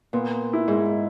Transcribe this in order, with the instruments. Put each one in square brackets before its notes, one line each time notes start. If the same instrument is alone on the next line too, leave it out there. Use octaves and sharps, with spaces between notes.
[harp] A#2 [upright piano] B3
[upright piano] E4
[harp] G#2